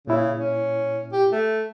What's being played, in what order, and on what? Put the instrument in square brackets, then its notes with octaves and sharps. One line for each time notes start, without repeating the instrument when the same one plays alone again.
[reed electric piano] A#2 E4 [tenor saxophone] C#3
[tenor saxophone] C#4
G4
A3